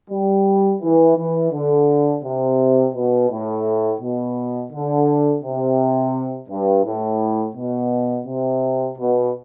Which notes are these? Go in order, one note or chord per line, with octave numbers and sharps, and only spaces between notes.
G3
E3
E3
D3
C3
B2
A2
B2
D3
C3
G2
A2
B2
C3
B2